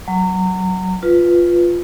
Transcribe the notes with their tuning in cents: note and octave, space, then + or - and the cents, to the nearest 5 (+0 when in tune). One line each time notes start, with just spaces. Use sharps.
F#3 +10 A#5 -30
F4 +0 B4 +0